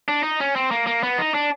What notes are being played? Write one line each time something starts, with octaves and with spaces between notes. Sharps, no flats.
D4
D#4
C#4
C4
A#3
A#3
B3
D#4
D4